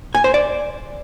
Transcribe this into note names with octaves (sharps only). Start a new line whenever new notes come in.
G#5
C5
D5